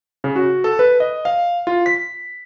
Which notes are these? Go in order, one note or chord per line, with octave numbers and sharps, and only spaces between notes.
C#3
F#4
A4
B4
D#5
F5
F4
B6